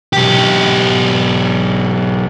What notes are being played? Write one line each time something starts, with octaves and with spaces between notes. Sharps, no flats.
B1 G4